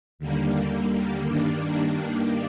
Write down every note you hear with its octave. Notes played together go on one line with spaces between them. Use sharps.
D#2 D3 G3 A#3
G2 D#3 G3 A#3 D4